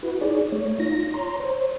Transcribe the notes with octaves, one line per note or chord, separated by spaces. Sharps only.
E4 F#4 B4
D#4 G#4 C#5 D5
A3 C#5
D#4 F4 A#6
C#5 A#5 C6
C5 C#5